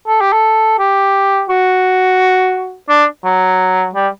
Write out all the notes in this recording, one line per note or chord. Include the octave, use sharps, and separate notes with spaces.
A4
G4
A4
G4
F#4
D4
F#3
G3